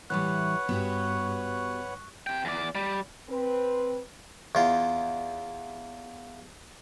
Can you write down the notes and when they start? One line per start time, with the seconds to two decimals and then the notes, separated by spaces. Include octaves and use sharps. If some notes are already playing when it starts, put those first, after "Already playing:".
0.10 A2 E3 G3 B4 C#5 F#5 C#6 F#6
0.69 G2 B3 F#4 G4
2.27 C3 G5
2.45 E2 D5
2.75 G3
3.30 C4 B4
4.55 E2 F4